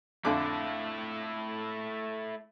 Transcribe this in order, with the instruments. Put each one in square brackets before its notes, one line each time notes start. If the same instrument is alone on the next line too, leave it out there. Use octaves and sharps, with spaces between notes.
[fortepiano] F2 D3 D6 [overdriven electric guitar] A3 E4